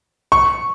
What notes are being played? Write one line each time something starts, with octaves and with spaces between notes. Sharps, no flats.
C#6